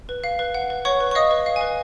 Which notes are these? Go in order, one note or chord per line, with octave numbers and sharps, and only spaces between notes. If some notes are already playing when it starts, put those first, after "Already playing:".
B4
F5
B4
F#5
B4
C#5 F#5 C#6
B4
C#6
D#5 F5 D#6
B4
F5
G#5
B4